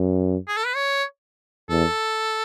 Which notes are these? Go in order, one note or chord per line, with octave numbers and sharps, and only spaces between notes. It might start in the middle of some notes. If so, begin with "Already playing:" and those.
Already playing: F#2
G#4
A4
B4
C#5
E2 A4